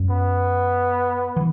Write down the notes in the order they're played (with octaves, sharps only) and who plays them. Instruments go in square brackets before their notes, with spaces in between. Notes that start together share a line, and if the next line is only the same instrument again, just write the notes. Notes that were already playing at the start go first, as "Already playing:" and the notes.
Already playing: [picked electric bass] F#2
[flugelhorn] B3
[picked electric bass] E3